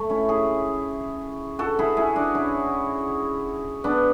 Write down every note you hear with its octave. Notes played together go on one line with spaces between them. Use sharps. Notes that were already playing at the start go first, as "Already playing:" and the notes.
Already playing: A3
C#4 E4
E4 G#4
F#4 A4
E4 G#4
E4 G#4
D4 F#4
C#4 E4
B3 D4